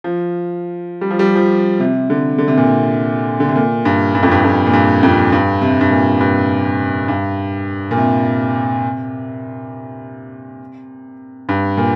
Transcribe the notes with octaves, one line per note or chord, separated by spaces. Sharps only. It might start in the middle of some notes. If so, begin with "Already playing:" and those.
F3
G3
F3
G3
F3
C3
D3
D3
C3
A#2
C3
D3
C3
A#2
G2
G2
F2
G2
F2
A#2
G2
F2
G2
C3
G2
A#2
G2
G2
A#2
C3
G2
A#2